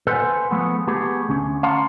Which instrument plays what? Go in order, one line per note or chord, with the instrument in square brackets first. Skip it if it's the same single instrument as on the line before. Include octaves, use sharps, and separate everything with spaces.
[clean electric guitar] A4 B4 C5 E5 F#5 G#5
F3 G#3 A3 B3
A3 B3 G4 G#4
D2 C#4
F5 F#5 A5 A#5 C6